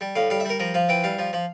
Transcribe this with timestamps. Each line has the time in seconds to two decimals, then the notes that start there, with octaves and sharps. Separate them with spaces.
0.01 G3
0.16 A2 F5
0.30 G3 F5
0.40 E5
0.45 G3 A#4
0.59 F3 A#4
0.74 F3 F5
0.89 E3 G5
1.04 G3 F5
1.19 F3
1.33 F3